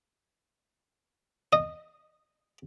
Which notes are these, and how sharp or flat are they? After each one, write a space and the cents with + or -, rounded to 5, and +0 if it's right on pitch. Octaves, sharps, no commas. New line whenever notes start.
D#5 -15